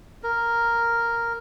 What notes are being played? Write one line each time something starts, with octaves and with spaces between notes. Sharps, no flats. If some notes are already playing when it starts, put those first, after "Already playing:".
A#4